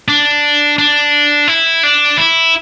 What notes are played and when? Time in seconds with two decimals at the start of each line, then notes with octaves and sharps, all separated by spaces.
0.08 D4
0.78 D4
1.48 E4
1.83 D4
2.17 E4